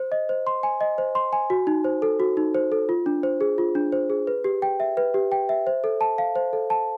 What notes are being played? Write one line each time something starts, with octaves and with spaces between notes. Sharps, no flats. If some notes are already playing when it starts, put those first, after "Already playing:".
Already playing: C5
D#5
C5
C6
G#5
D#5
C5
C6
G#5
F#4
D#4
C5
A4
F#4
D#4
C5
A4
F4
D4
C5
G#4
F4
D4
C5
G#4
B4
G4
G5
E5
B4
G4
G5
E5
C5
A4
A5
F5
C5
A4
A5